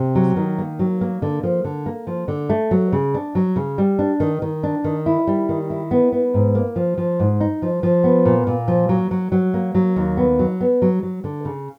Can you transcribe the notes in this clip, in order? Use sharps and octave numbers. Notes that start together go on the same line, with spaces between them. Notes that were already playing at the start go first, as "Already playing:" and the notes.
Already playing: C3
F#3
D#3
A#3
F#3
A#3
D3
F3
D3
A#3
F3
D3
A3
F#3
C#3
D4
F#3
C#3
G3
D4
D#3
D#3
D4
D#3
E4
G3
D#3
E4
B3
B3
G#2
A#3
F3
F3
G#2
D#4
F3
F3
B3
A#2
A#2
F3
F#3
F#3
F#3
A#3
F#3
D#2
B3
F#3
B3
F#3
F#3
D3
C#3